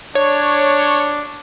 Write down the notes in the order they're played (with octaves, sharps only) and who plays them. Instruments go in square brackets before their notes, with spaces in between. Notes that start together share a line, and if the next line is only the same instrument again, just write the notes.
[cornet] D4 [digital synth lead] C#5